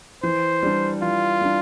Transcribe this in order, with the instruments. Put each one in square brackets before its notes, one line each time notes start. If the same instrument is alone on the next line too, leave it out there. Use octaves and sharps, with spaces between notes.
[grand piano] E3 [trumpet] C5
[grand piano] G3 D4
[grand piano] E3 [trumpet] F4
[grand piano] G3 D4